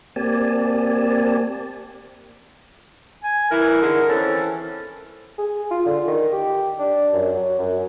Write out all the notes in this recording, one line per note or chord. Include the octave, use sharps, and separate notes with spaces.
A#3 C4 G4 D5 G#5 A5
G#5
E3 E4 A#4
D3 D#3 G#4
E3 C4 C#4 A4
G#4
F4
D3
D#3
G4
D4
F#2
F#3
F#2